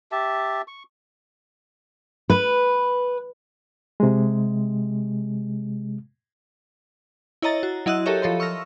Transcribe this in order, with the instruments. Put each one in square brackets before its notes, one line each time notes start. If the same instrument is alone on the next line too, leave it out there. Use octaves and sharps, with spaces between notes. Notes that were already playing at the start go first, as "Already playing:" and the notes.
[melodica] G4 E5 A5
C#6
[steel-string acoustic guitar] B4
[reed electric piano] C3 G#3
[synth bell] E4 C#5 D#5 A#5 A6
F#4
F#3 E4 D#5 E6 F#6
G4 A4 A#4 C#5 E5
F3 A4 C#5 C6
C#6 E6 F6 A#6